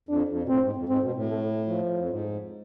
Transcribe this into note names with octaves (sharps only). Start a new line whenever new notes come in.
F2 D4
F2
B2
A2 C4
G#2
F2
G#2 C4
B2
A2
A3
F3
F2
G#2